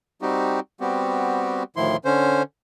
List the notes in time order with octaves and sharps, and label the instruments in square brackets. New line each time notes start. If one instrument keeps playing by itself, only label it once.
[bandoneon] G3 C4 D#4 F#4 G4
G3 B3 C4 F#4 G4
D2 A2 D#3 F3 E4 C6
D3 C#4 C5